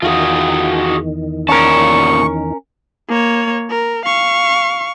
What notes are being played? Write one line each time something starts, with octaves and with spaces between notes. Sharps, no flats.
E2 D#3 F4 F#4 G#4
A#2 C#3 C#4 A#4 A5 C#6
A#3 C#5
A#4
F5 C#6